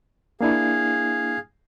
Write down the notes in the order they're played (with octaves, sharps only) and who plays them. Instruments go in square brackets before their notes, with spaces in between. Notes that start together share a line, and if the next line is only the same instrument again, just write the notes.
[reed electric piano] A#3 D4 E4 [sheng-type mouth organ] G#4 F5